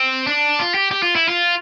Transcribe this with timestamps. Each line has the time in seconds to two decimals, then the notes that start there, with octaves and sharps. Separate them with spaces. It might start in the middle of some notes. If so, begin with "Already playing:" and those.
Already playing: C4
0.27 D4
0.59 F4
0.74 G4
0.91 G4
1.03 F4
1.15 E4
1.28 F4